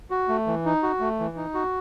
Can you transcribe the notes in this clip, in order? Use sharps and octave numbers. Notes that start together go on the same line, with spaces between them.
F#4
A3
E3
D#4
F#4
A3
E3
D#4
F#4